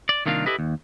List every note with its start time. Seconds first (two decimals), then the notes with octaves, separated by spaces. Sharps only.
0.09 D5
0.26 C2 D#3 A#3 D4 F4 F5
0.46 E4 G4 A4 B4 D#5
0.59 D#2